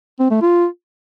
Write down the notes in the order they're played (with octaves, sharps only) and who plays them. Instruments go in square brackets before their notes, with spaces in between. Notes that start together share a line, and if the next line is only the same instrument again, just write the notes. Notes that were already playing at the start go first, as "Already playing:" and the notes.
[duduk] C4
A3
F4